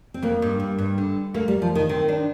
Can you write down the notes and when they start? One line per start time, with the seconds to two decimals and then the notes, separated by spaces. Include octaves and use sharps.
0.14 C4
0.23 F2 A#3
0.42 G2
0.60 G2
0.79 G2
0.98 D3
1.34 A3 A#3
1.48 G3
1.62 F3
1.75 D#3
1.89 D#3 C4
2.09 D4